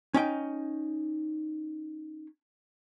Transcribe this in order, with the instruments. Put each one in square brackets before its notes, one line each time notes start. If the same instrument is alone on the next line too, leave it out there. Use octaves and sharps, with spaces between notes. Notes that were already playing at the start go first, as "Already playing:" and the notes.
[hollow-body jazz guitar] C#4 D#4 G5